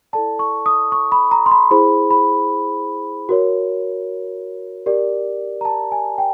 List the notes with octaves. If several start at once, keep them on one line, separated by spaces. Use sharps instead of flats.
E4 A4 D5 A5
C#6
D#6
C#6
B5
A#5
C6
B5
E4 G#4 C5 B5
B5
F#4 A#4 C#5
G4 A#4 D5
A#5
A5
G#5
G5